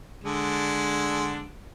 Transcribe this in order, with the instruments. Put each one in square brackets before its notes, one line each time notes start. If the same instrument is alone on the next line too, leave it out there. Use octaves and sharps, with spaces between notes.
[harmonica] D3 G#3 D4